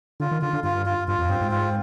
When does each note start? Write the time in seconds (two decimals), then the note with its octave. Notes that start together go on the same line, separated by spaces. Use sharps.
0.20 D3 F4
0.31 D#3
0.42 D3 F4
0.53 D3
0.63 G2 F4
0.86 F4
1.08 G2 F4
1.18 F2
1.29 G2 C4
1.41 G#2
1.51 F4